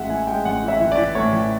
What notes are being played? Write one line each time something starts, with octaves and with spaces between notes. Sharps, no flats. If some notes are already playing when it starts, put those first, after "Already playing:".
Already playing: A1 G#3 E5 F#5
E3 G#5
G#3 G5
A1 F#5
E3
E5
E3
D5
E3
A2 C#5
E3